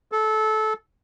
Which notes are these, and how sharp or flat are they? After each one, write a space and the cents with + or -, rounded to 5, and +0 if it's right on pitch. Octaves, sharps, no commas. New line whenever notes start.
A4 -20